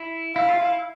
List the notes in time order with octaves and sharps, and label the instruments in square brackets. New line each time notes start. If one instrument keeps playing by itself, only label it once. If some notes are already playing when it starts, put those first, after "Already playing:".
Already playing: [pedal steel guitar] E4
[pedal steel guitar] E4 [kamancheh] F5
[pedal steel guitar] F4
E4